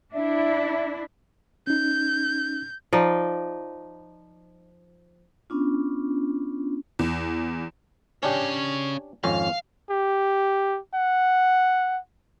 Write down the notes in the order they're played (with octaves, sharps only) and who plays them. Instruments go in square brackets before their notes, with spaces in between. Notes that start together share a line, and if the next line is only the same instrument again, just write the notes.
[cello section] D4 E4 [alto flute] E5
[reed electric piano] C#4 D#4 [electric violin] G6
[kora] F3 D#4 D5
[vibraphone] B3 C#4 D4 F4
[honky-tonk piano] E2
[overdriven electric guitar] C#3 C#5 [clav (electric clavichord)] C#4 D4 G4
[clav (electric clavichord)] G#1 F2 C#4 [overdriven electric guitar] F5
[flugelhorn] G4
F#5